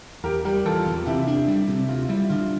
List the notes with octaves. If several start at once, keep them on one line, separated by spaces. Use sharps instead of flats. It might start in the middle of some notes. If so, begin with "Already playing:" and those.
E2 G4 A#4
G3 G4 A#4
E3 F4 A4
E2
C3 E4 G4
D4
G3
C3
D2 F4
G3 E4
D3 F4